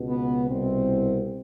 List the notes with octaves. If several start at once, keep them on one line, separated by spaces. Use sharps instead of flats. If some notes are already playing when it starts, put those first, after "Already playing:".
Already playing: C#2 B2
B3
C2 B2 C4